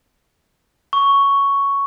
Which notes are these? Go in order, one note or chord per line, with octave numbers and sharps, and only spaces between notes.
C#6